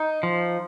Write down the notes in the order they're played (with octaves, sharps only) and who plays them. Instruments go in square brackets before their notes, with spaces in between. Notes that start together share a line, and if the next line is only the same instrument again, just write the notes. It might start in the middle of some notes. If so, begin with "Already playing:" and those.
Already playing: [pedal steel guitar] D#4
F3